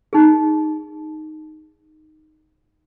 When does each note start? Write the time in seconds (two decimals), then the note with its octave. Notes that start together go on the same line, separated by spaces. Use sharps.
0.13 D#4 G#4